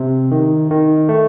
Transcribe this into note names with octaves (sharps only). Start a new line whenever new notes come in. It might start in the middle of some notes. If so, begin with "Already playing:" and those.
Already playing: C3
D#3
D#3
A3